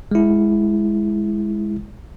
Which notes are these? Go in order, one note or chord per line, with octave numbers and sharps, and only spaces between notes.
G#3 E4